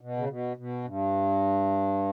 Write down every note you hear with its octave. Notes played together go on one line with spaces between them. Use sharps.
B2
C#3
B2
B2
G2